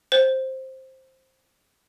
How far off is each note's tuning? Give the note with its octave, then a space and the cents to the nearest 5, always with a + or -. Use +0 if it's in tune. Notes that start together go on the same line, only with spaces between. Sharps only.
C5 +5